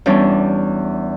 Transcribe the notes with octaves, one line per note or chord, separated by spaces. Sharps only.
E2 G3 C#4 D4